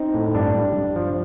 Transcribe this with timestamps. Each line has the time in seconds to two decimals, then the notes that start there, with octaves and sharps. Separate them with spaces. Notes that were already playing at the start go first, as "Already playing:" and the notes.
Already playing: C4 D#4
0.14 A2
0.35 G2 D4
0.55 G2
0.76 G2
0.96 F3